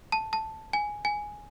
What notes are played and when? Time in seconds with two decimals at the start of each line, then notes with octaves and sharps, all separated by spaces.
0.12 A5
0.33 A5
0.73 G#5
1.05 G#5